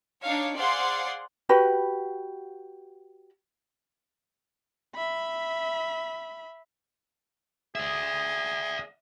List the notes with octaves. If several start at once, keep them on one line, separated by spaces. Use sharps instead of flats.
D4 D#4 C#5 F5
G#4 C5 D5 F5 F#5 C6
F#4 G4 B4 B5
E5 B5
G#4 D5 E5